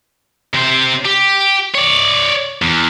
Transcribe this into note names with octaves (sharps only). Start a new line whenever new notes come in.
C3 C5
G4
C#5 D5
E2